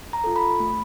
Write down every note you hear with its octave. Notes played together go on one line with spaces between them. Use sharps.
A#5
F4 A4
B5
A3